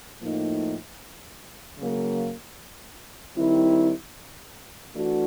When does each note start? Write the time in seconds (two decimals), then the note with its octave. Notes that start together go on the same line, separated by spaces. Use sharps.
0.21 A2 F3 A#3 D#4
1.79 C#3 F#3 A#3
3.37 D#3 G3 C4 E4
4.95 E3 A3 D4 F#4